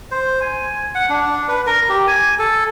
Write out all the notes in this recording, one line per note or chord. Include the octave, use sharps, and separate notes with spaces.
C5
G#5
F#5
D4
B4
A#4
G4
G#5
A4